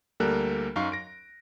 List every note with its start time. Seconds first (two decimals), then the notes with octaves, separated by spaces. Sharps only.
0.20 D2 G3 A#3 A4 A#4 F#6
0.76 F#2 D#4 F5 C#6
0.92 A#6 D7